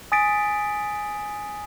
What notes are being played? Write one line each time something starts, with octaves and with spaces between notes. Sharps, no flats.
G#5 D#6 A6 B6 D7